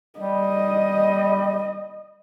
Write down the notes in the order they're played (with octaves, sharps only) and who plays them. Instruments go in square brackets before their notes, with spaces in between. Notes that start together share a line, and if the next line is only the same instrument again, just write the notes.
[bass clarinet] G3 [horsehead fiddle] D#5